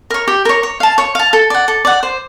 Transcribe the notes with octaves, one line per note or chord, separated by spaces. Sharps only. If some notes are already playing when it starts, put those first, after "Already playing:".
A#4 C#5
G4
A#4 C#5
C#5
F5 A5
C#5
F5 A5
A4
D5 F#5
A4
D5 F#5
C5